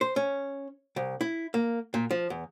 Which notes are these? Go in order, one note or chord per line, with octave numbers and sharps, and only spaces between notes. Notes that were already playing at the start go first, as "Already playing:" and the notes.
C5
C#4
C2
E4
A#3
A#2
F3
E2